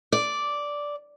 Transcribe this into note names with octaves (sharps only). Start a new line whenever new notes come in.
D5